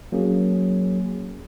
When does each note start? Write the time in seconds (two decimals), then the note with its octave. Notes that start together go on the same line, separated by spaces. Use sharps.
0.12 F#3 A#3 C#4 G#4